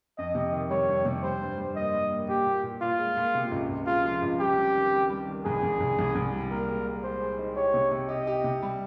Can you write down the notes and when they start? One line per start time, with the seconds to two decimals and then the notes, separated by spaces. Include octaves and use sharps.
0.18 F2 D#5
0.35 C3
0.52 D#3
0.70 G3 C#5
0.89 F2
1.05 C3
1.23 G3 C5
1.42 G2
1.58 G3
1.76 A#3 D#5
1.94 G3
2.11 A#3
2.28 A#2 G4
2.47 A#2
2.63 A#2
2.82 A#2 F4
2.99 G#3
3.17 A#2
3.35 C3
3.52 C#2
3.69 C#2
3.87 G#3 F4
4.04 F3
4.22 C#2
4.39 G3 G4
4.57 C4
4.75 D#3
4.93 G3
5.10 G3
5.28 D#3
5.45 C2 G#4
5.63 C2
5.80 C2
5.98 C2
6.15 C2
6.33 G3
6.51 A#2 A#4
6.68 G#3
6.86 G#3
7.04 G#3 C5
7.22 G#4
7.39 D#4
7.56 G4 C#5
7.74 C3
7.92 C3
8.09 G4 D#5
8.27 G4
8.44 C3
8.62 G3